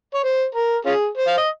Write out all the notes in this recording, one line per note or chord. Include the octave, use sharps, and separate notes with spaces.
C#5
C5
A#4
C#4 F4 G#4
C5
F5
D#5